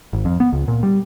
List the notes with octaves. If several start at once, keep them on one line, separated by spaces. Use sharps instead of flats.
G#1
F2
B3
C#2
A#2
G3